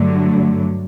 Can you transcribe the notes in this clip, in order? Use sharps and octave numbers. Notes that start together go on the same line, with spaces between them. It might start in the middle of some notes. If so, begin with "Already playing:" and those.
Already playing: G2 D3 F#3 A3